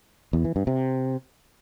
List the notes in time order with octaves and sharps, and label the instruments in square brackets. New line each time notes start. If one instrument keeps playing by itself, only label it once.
[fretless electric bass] E2
E3
G2
C3